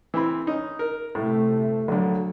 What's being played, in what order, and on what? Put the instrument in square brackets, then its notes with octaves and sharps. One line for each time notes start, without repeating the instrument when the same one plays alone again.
[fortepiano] E3 C4 B5
C#4 D#4
A#4
[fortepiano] A2 [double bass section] C3 A3
[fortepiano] A#1 D3 [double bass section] F#3